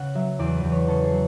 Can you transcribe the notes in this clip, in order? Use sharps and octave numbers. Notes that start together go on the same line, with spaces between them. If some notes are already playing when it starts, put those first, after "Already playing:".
Already playing: C#3 F#5
F#3 E5
E2 D5
B4
E2
C#5
C#3 A4
G#4
F#3